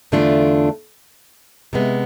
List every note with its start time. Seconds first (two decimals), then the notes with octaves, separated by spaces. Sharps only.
0.12 E2 D3 A3 D4 F4
1.73 C3 G#3 B3